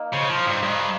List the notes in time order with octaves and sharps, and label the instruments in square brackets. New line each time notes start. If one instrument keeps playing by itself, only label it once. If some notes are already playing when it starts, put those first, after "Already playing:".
Already playing: [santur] A#3 D#4
[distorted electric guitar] C#3 [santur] C5
[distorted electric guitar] F3
[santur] C5
[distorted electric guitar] G2
[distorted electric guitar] G2 [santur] D#5